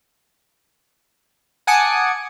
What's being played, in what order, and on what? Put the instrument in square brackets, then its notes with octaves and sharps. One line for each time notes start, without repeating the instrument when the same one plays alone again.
[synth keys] F#5 G#5 A5 D6 D#6 C#7